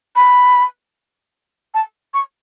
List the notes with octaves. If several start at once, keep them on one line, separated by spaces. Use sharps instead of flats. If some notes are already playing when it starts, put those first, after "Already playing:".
B5
A5
C#6